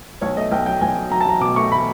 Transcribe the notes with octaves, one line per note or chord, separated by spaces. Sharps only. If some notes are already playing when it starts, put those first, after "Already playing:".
B1 C#5
A3 D#5
B1 G5
F#3 G5
B1 G#5
F#3
F#3 A#5
A5
F#3 A#5
B2 D6
A3 C#6
B5